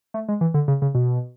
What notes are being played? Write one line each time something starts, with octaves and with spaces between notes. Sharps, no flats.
A3
G#3
E3
D3
C#3
C#3
B2